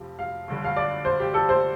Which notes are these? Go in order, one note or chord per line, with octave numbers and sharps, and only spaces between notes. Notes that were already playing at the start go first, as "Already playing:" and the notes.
Already playing: F1 F2 F3 G4
F5
G1 G2 D3
F5
D5
C5
G4
A4
C5